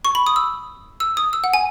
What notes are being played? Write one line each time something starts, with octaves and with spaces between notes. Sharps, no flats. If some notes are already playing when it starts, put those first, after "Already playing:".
C#6
B5
D#6
E6
E6
D#6
E6
F#5
G#5